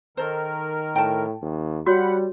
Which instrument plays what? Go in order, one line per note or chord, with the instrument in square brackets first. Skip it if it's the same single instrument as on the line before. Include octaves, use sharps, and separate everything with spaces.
[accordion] D#3 A#4 [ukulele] A4 C5
[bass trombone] A2 [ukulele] G5 A5
[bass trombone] D#2
[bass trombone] G3 [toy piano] F#4 C#5 [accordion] F#5 B5